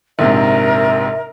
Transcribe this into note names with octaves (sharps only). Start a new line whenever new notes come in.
A#1 G#2 C3 A#4 E5